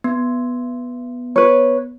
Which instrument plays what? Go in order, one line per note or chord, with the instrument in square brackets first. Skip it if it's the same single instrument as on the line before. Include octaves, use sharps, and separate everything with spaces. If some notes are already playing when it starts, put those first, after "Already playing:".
[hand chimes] B3
[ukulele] B4 C#5